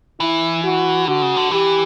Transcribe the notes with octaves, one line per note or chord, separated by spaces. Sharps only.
E3 E4
F#4
D3 F#4
C#3
D3
E3 G4